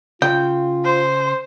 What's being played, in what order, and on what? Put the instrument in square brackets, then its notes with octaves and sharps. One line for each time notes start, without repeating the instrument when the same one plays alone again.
[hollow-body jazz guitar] C#3 [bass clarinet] F4 [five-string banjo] G5
[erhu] C5